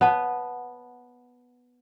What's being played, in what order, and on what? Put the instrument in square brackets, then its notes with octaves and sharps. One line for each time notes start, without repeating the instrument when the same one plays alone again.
[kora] B3 [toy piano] C#5 F#5 A5